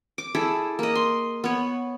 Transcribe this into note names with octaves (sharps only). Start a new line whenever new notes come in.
D6
E4 G#4 A4 D5
A#3 D#5
C6
B3 C#5